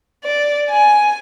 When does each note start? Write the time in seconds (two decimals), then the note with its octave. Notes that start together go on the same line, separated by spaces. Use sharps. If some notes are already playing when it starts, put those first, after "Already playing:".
0.24 D5
0.70 G#5